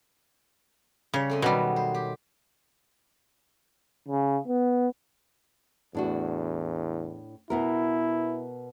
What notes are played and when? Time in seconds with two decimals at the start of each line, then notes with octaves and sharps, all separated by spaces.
1.14 C#3 G3 C#5
1.29 A3 C4 D#5
1.42 B2 D#3 F#3 G3 B3
1.76 C5
1.94 G4
4.09 C#3
4.48 B3
5.95 E2 A2 D4 F#4
7.50 B2 B3 E4 A#4